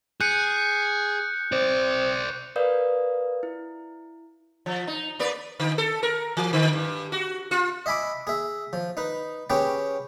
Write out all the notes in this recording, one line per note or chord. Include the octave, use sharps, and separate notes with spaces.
G#4 F#6 G6 C#7
C4 C5 D5
A#4 B4 D5 F5 D#6 G6
E4
F3
D#4
A#3 B4 D5
D3
A4
A#4
E3
D3
G2
F#4
F4
D#5 E5 G#5 B5 D6
G#4 E5
F3
D#4 B4
C#4 G4 G#4 B4 G5